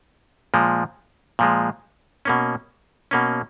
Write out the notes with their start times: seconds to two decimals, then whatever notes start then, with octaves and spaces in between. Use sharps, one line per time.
0.54 A#2 F3 G#3
1.39 A#2 F3 G#3
2.25 B2 A#3 C#4
3.11 B2 A#3 C#4